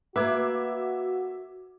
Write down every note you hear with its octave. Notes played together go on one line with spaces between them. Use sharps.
A#3 F#4 B4 E5 D6 G#6